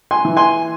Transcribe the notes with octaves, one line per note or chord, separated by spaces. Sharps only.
G#5 C6
E3
G#5 C6